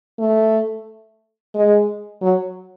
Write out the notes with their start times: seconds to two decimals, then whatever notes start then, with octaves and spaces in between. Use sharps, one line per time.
0.19 A3
1.55 G#3
2.22 F#3